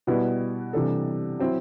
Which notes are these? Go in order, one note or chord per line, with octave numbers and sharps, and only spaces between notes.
B2 G3 B3 E4 B4
C3 E3 G3 D4 A4
F#3 C4 E4